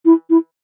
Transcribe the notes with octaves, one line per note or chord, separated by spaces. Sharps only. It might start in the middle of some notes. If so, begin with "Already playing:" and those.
E4
E4